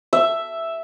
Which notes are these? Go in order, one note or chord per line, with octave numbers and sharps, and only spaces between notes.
E5